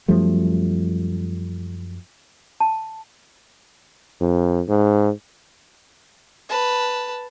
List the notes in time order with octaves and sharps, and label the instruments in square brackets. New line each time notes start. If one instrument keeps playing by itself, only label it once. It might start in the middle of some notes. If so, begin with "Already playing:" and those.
[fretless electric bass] F#2 F3 G3 A3
[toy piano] A5
[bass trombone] F2
G#2
[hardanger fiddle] B4 A5